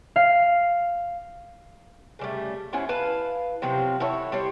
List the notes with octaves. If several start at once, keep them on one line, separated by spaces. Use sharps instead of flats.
F5
C#3 G3 A3
C#4 E4 F#4 C5
E4 B4 F5 A5
C3 F3 F#3 C4
E4 F#4 A4 C#5
G3 C5 C#5